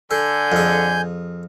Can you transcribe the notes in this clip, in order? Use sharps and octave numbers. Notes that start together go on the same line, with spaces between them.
D3 A4 G#5 G6
F2 G#4